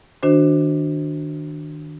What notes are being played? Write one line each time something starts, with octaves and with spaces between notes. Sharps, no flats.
D#3 D4 F#4 C5